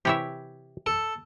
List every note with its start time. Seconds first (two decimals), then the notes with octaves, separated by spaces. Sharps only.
0.05 C3 E3 E4 G4 C#5 E5
0.86 A4